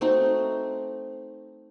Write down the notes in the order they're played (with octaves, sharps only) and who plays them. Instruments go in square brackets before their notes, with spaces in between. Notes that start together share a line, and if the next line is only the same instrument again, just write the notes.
[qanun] A3 C4 D#4 F#4